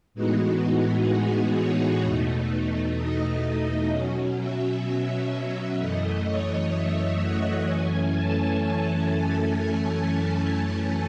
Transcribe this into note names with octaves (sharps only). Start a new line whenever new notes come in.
A2 E3 G#3 B3 D#4 F#4
G#4
C#5
E2 B2 A3 D#4
D#5
B2 F#3 C#4
E5
E5
F#2 E3 A3 D#5
C#5
E5
F#5
F#2 E3 A3 C#4 G#5
A5